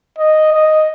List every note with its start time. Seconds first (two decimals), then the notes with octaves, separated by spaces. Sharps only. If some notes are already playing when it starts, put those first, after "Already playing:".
0.19 D#5
0.52 D#5